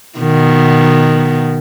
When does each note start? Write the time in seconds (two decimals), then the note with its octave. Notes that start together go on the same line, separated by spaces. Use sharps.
0.19 B2 D#3 B3